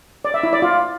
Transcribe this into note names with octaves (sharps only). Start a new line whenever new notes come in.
D5
E5
E4
D5
F4